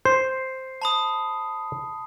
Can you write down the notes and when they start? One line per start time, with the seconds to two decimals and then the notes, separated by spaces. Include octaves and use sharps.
0.05 C5 C7
0.82 A5 B5 D#6